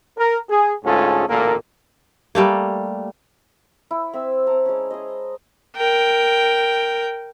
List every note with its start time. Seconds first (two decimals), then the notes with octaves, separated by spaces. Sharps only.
0.17 A#4
0.49 G#4
0.84 D2 G#2 C#4 F4 G#4 A4
1.28 A1 D2 A#2 A#3 A4 A#4
2.35 G3 A3 A#3
3.91 E4
4.13 C4 E5 E6
4.47 A5 A#5 C#6 D6
4.66 G#3 C#4
4.91 G#4 C5 D#5
5.77 A#4 G5